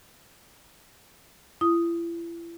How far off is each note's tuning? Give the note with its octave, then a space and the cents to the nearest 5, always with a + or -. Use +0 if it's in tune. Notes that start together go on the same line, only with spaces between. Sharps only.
E4 +40 D#6 +0